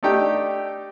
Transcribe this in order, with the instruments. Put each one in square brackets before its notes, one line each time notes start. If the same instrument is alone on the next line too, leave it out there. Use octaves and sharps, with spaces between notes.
[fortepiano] A3 D4 D#4 G4 G5